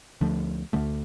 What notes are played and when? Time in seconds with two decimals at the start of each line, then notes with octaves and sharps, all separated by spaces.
0.21 D2 D3 F3 A3
0.73 D2 D3 F3 A3